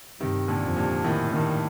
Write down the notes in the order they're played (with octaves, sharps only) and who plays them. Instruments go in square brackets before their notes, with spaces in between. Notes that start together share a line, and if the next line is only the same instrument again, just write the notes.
[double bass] G2 [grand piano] C3 D#3
[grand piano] A#2 D3
[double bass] F2
[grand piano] G2 A#2
[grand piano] A2 [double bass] D#3
[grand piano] G2 A#2 [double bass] D#3